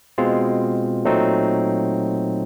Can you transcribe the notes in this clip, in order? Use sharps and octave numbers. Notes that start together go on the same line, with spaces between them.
B2 G#3 C4 F4
A#2 F#3 A3 C4 D#4